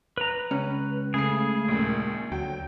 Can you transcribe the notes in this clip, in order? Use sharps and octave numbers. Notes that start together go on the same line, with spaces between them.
B4 A#5
C#2 C#4
C#3 A3 G#4 C7
A#1 D#2
D2 F#3 G5